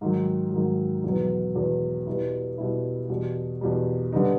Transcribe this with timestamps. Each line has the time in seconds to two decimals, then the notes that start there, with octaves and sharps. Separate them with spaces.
0.01 G#2 D#3 F#3
0.52 G#2 D#3 F#3
1.04 E2 B2 F#3 B3
1.55 E2 B2 F#3 B3
2.07 B2 G3 B3 E4
2.58 B2 G3 B3 E4
3.09 E2 B2 G3
3.61 E2 B2 G3
4.13 D3 G3 B3 D#4